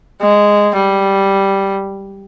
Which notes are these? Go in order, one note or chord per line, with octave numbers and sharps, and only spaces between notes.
G#3
G3